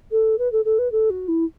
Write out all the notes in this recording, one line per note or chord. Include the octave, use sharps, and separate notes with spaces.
A4
B4
A4
A4
B4
A4
F#4
E4